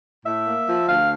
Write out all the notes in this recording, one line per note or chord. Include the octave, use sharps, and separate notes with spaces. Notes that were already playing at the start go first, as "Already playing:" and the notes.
A2 E5
A#3
F3
D2 F5